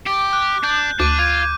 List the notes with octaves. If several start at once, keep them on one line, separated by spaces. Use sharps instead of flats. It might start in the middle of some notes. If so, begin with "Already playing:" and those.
G4 D6
F#6
D4 G6
D2 D4 D6 D#7
F4 G#6